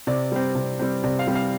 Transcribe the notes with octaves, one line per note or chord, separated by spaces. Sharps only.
C3 D5
G3 C4
C3
G3 C4
C3 D5
F5
G3 C4
F5